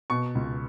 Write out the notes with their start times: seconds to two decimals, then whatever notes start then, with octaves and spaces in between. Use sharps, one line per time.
0.10 B2 C#6
0.35 C#2